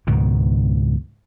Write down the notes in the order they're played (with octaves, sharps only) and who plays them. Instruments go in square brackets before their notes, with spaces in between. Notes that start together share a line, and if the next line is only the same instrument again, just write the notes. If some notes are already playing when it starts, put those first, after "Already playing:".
[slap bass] C#2 G#2 B2 D#3